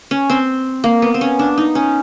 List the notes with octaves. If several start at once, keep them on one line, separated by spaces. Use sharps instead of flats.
C#4
C4
A#3
B3
C4
C#4
D4
D#4
C#4